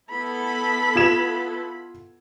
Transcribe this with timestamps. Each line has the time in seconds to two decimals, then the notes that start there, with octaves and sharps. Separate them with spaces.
0.10 B3 E4 A4 B5
0.95 F4 G#6 E7